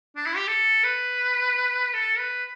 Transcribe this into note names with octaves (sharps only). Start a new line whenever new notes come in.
D4
E4
G4
A4
B4
A4
B4